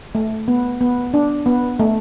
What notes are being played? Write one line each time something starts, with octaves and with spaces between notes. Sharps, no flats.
A3
B3
B3
D4
B3
A3